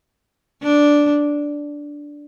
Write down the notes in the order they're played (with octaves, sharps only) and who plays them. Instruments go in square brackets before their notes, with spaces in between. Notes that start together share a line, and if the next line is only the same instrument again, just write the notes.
[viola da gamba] D4